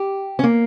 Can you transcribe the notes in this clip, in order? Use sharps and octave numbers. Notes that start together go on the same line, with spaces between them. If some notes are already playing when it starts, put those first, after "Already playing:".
Already playing: G4
C#4
A#3